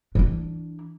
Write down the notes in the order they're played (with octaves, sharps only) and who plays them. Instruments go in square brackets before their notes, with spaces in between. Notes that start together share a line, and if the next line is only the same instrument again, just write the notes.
[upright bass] E3 D4